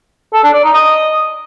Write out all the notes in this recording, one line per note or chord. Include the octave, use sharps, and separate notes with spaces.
A4
D4
D5
D#4
D#5